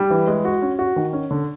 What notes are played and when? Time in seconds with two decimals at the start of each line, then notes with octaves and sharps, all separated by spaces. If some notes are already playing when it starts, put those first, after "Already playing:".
Already playing: G3
0.10 E3
0.27 G#3
0.45 F#4
0.62 C#4
0.79 F#4
0.96 D#3
1.13 C#4
1.31 D3